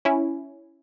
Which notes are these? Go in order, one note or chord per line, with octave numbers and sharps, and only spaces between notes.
C#4 E4